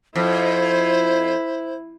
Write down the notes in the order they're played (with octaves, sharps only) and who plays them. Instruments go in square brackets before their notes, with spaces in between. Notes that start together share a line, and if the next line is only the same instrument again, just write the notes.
[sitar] F2 [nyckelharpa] E4 [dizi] C5